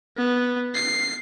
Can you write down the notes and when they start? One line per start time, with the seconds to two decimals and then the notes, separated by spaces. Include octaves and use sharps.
0.17 B3
0.75 C7